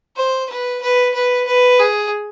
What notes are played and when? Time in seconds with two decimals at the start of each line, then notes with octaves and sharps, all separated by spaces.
0.16 C5
0.49 B4
0.81 B4
1.14 B4
1.47 B4
1.79 G#4